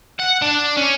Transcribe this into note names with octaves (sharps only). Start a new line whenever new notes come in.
F#5
D4
C#4